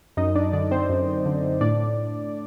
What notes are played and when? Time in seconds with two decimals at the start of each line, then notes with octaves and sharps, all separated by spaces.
0.17 F#2 D#4 D#5
0.35 D4 D5
0.53 D3 D4 D5
0.71 C4 C5
0.90 F#2
1.26 D3
1.61 A2 D4 D5